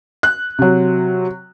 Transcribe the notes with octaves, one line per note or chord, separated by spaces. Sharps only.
F#6
C3 F#3